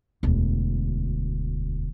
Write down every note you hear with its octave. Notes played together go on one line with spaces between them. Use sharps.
E1 D2